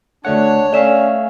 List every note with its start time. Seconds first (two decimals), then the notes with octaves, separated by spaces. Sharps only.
0.25 D2 A3 D4 C#5 F#5
0.73 A3 C#4 D5 E5 F5 E7